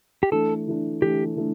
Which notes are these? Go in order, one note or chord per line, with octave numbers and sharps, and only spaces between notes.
G4
E3 A3 D4 A4
E3 A3 D4
E3 A3 D4 G4
E3 A3 D4